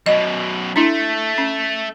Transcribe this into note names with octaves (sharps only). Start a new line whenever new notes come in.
F#2 B2 D#5
A3 D4 E4
C#4